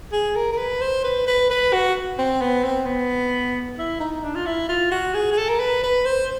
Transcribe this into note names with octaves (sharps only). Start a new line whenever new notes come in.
G#4
A#4
A#4
B4
C5
B4
B4
B4
F#4
C4
B3
C4
B3
E4
D#4
D4
F4
E4
F4
F#4
G#4
G#4
A4
A#4
B4
B4
C5